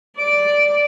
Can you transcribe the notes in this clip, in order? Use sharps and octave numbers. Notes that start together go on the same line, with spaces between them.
D5 D7